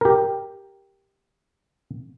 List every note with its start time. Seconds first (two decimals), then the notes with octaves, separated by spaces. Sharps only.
0.01 G4 A#4